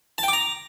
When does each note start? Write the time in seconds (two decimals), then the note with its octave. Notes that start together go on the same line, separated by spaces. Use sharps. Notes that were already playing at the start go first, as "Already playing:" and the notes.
0.18 A5
0.23 G5
0.28 D6
0.33 A#5